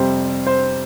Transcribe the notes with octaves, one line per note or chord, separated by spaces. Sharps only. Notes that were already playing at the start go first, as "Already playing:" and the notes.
Already playing: F2 C3 G3 C5
C5